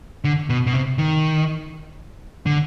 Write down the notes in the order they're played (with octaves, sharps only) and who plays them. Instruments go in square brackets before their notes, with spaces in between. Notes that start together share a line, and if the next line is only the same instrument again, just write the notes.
[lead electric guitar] D3
B2
B2
C3
D#3
D3